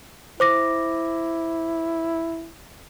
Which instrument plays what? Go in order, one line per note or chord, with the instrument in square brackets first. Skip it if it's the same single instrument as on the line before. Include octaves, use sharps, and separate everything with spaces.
[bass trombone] E4 [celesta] C5 D6 A#6